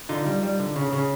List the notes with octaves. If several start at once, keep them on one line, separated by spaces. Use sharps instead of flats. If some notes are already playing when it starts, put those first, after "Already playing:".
D3 D#4 F4
G3
G3
D3
C#3
C#3